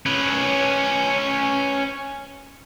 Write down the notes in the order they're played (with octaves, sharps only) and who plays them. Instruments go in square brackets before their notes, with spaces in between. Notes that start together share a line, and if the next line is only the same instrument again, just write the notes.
[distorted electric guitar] C#4 B4